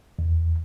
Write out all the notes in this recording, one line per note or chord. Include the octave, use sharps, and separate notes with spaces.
E2